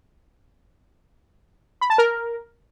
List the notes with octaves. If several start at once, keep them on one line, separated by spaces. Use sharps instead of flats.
B5
A5
A#4